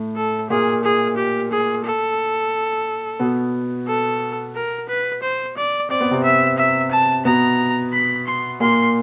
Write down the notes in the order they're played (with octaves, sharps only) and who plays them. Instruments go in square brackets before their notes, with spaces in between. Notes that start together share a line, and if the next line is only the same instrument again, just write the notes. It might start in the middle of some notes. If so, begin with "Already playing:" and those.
Already playing: [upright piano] A2 A3
[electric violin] A4
[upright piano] A#2 A#3 [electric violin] G#4
[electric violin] G#4
G4
G#4
A4
[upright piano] B2 B3
[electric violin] A4
A#4
B4
C5
D5
[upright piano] C4 [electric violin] D5
[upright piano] B3
C3 C4
[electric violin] E5
E5
A5
[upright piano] B2 B3 [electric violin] A#5
[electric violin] B5
C6
[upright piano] A#2 A#3 [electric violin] C6